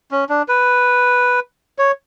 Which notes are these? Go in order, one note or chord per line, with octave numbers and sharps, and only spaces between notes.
C#4
D4
B4
C#5